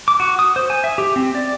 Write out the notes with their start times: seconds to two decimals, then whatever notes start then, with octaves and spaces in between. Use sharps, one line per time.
0.08 D6
0.20 F#4
0.39 D#6
0.56 C5
0.70 G#5
0.84 E5
0.98 G4
1.16 C4
1.35 D5